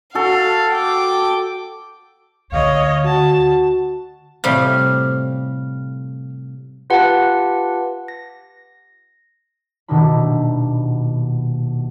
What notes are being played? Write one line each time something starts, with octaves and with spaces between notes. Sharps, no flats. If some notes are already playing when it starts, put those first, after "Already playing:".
F#4 A4 F5
G5 D6
D2 D3 C#5 D#5 F5
F#4 A5
A2 C3 G3 F5
F4 G4 B4 F#5 A5
A#6
D#1 B2 D#3 D4 E4 B5